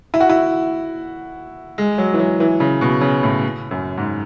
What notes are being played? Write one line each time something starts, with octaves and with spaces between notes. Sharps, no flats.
E4
F#4
E4
G#3
F#3
E3
F#3
E3
C#3
B2
C#3
A2
F#2
G#2